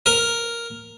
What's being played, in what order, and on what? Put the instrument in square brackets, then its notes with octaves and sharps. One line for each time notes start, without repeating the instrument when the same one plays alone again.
[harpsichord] A#4